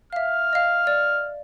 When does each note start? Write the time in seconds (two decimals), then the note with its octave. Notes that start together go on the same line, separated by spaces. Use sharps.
0.13 E5 F5 F6
0.53 D#5 F5
0.87 D5